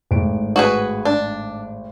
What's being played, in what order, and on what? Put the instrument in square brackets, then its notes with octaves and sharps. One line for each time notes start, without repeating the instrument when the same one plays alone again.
[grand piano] G#1 A2 D7
[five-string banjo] F#4 G#4 B4
D4